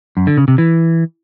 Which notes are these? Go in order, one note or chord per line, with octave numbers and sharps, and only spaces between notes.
F#2
D3
C#3
C3
E3